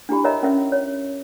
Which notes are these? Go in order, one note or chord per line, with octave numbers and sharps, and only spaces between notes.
D4 E4 G4 B5
A#4 C#5 D#5 E5 A#5
C#4 A#4 E5
C#5